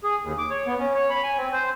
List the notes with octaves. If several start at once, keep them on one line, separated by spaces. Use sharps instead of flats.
G#4
D#2
D6
C#5
B3
C#4
C#5
B5
G#5
C4
C5